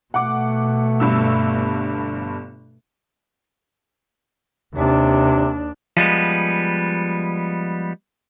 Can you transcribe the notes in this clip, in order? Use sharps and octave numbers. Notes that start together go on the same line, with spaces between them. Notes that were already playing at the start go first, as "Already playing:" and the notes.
B2 A3 F#5 D6
G1 G2 E6
D#2 C3 D4
F3 G3 G#3 B3